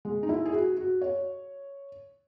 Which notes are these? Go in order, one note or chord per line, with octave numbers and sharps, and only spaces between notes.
G#3
D#4
E4
G#4
F#4
F#4
C#5